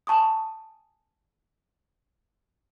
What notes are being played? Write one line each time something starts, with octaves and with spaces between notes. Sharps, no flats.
G#5 A5 C#6 D#6